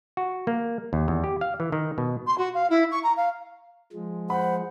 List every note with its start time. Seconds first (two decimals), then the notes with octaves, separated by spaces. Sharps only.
0.17 F#4
0.47 A#3
0.93 D#2
1.08 E2
1.24 G4
1.41 F5
1.60 E3
1.72 D#3
1.98 B2
2.26 C6
2.38 F#4
2.54 F5
2.69 E4
2.91 C#6
3.03 A#5
3.16 F5
3.93 F3 G#3
4.30 C5 F#5 B5